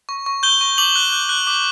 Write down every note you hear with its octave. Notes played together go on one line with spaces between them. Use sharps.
C#6
C#6
G6 G7
C#6
D6 F#7
F#6
F#6
F#6
D6